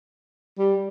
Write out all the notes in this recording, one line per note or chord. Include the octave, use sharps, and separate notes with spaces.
G3